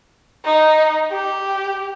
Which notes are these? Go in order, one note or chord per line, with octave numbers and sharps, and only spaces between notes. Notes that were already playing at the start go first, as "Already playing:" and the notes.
D#4
G4